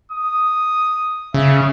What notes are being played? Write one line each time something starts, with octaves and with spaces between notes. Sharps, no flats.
D#6
C#3 E5